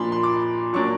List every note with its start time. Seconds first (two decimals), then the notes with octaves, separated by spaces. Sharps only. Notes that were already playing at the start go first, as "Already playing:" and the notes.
Already playing: A#2 F3 A#3 D4 B5 C6
0.12 C6
0.23 D6
0.73 A#2 F#3 A#3 D4 C#6